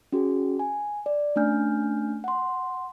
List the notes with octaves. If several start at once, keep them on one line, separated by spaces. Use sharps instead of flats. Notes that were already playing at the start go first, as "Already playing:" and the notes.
C#4 F#4 G#4
G#5
D5
A3 C#4 D4 G#5 F6 G6
F#5 C6